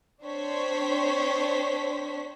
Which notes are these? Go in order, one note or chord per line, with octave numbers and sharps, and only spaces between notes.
C4 D4 C5 C#5 B6